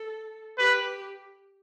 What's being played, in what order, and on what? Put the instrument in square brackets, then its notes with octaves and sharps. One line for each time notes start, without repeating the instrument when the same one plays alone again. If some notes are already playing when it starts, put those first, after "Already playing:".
Already playing: [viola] A4
[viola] G4 [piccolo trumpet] B4